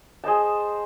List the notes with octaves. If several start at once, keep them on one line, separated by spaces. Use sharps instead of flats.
G#4 C5 D#5 A5